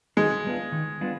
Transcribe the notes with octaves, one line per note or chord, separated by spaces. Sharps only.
D#3 G#3
G3 B3 D4 F4
D#3
G3 B3 D4 F4